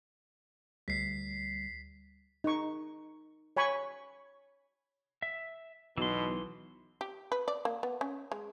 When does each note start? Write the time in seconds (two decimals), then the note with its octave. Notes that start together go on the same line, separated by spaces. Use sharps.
0.88 D2 G3 B6 C7
2.44 D#4 C#6
3.57 C#5 G#5 B5 C#6
5.22 E5
5.98 B1 B2 E3 C6
7.01 G4
7.32 B4
7.48 D5
7.65 A#3
7.83 B3
8.01 C#4
8.32 G#3